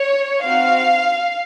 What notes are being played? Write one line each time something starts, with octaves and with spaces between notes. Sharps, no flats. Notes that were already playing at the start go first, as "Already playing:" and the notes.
Already playing: C#5
C4 D#4 F#4 F5